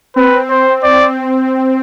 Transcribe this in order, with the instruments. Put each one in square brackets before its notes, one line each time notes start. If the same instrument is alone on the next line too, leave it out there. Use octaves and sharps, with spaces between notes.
[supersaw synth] C4 [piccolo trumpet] B4
[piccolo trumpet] C5
[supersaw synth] C4 [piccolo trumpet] D5